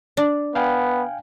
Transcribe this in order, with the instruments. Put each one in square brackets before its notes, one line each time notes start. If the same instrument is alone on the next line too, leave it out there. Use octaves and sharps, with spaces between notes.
[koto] D4
[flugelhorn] B3 [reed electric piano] F5 G5 G#5